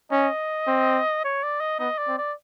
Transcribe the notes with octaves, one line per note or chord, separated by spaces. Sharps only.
C#4 D#5
C4
C#5
D5
D#5
B3 D#5
D5
C4
D5